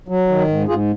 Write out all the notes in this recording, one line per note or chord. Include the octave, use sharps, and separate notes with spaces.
F#3
D#3
G#2
G#2 F4 G#4